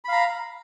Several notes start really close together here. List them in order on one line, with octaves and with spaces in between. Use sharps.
B5 F5 A#5